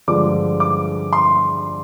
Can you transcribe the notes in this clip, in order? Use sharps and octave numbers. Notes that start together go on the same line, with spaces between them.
G2 D3 F3 G#3 D6
D6
C6